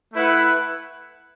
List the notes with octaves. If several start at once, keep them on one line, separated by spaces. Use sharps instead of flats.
A3 E4 B4 F#5